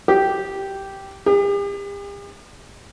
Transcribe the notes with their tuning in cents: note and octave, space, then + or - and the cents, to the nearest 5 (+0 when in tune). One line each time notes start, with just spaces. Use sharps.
G4 -5
G4 +45